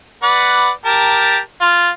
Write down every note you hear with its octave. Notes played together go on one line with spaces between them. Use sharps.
B4 D5 F#5
G4 A#4 A5
F4